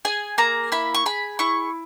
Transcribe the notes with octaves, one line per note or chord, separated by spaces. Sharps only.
G#4 G#5
A#3 A#5
E4 B5
C#6
G#4 B5
E4 C#6